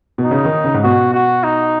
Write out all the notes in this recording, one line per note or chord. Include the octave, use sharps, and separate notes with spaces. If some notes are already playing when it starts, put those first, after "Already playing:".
B2
D#4
C#3
D#3
C#3
G#2
B2 F#4
F#4
D#4